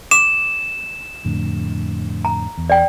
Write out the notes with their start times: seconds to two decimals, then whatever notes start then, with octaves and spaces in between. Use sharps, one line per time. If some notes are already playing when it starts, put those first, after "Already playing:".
0.11 D6 E7
1.25 F2 A2 D3
2.25 A#5
2.58 E2
2.70 D5 G5